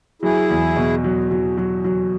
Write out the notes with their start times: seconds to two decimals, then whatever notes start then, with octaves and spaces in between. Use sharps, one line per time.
0.22 F#3 E4 G#4
0.50 E2
0.76 B2
1.04 F#3
1.31 F#3
1.57 F#3
1.84 F#3